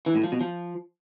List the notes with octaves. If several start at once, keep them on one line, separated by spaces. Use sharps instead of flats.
E3
A2
F3
B2
F3